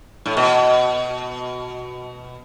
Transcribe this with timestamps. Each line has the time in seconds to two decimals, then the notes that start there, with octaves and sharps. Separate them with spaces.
0.26 A2
0.37 B2